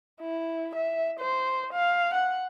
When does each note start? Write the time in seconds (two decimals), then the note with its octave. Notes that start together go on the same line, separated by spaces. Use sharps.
0.21 E4
0.75 E5
1.20 C5
1.73 F5
2.14 F#5